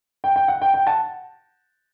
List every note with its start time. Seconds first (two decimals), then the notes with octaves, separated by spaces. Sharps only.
0.24 G5
0.36 G5
0.48 F#5
0.62 G5
0.74 G5
0.87 F#5 A5